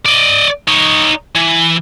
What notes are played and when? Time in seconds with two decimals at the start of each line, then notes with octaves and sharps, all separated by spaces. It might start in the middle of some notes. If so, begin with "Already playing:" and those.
0.06 D5 D#5
0.68 D#4 C#5
1.35 E3